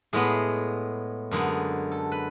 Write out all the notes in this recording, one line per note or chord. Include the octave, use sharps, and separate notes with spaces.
A2 G#3 B3 G#4
F#2 D3 G#3 B3 G#4
A4
B4